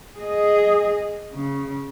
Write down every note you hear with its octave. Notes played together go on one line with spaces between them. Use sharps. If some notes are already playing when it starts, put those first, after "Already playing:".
G#4 D#5
C#3